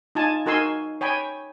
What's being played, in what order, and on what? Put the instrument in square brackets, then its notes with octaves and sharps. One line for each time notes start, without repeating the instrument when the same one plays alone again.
[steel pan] D#4 F4 G#5 A5
D#4 F#4 A#4 G#5 C6 E6
C#5 G5 G#5 B5